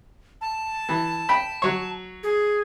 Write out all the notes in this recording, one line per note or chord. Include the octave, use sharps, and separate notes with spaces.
A5
E3
G5 B5
F#3 C#5
G#4